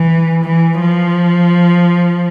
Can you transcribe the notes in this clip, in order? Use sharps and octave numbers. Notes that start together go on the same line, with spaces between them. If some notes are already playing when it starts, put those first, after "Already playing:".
Already playing: E3
E3
F3